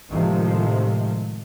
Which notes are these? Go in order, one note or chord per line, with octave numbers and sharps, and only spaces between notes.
A2 C3 D#3 F3 G#3